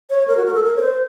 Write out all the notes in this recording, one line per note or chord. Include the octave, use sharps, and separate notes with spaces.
C#5
A#4
F#4
A#4
A4
A#4
C#5
C5